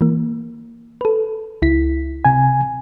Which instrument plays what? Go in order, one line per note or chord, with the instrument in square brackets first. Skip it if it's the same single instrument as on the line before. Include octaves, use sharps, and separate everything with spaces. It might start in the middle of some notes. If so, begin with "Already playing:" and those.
[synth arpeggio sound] E3 A#3
A4 B4
C#2 E4 B6
[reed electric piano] C3 G#5